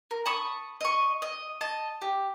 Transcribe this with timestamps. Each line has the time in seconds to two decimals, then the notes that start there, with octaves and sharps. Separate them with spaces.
0.11 A#4
0.26 A5 B5 C#6 D#6
0.81 D#5 C#6
1.22 D#5
1.61 D#5 A5
2.02 G4